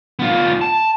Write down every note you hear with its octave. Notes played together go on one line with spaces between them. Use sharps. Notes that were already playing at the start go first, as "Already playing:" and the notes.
B3 F4
A5